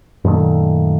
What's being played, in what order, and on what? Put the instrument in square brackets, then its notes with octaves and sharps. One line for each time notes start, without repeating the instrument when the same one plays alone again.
[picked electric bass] F#2 A#2 D#3 A3